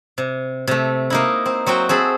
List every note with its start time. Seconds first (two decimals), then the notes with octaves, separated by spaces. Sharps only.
0.18 C3
0.68 C3 A3
1.10 A#3 D#4 E4
1.46 C4
1.66 F#3 C4 F#4 G5
1.89 C4 G#4 A4 B5